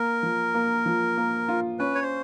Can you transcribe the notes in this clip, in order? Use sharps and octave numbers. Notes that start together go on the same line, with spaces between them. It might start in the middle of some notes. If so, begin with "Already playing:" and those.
Already playing: A#3 A#4
F3
A#3
F3
A#3
F4
C#4 B4
C#5
C5